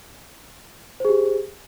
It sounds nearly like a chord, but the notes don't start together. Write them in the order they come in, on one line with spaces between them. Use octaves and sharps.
C5 G#4 G4